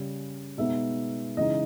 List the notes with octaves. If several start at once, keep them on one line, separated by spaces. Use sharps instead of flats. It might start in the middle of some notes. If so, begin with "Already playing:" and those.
Already playing: C#3 G3 C#4
B2 G#3 B3 D#4 E5
C#3 E3 G#3 D#4 D#5